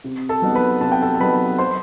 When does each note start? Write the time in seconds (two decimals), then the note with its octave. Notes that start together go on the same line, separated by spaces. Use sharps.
0.04 C3
0.29 A4 A5
0.42 F#3 B3 D#4
0.55 B4 B5
0.81 C3 A5
0.92 G5
1.02 A4 A5
1.15 A5
1.20 F#3 B3 D#4 B4 B5
1.58 C5 C6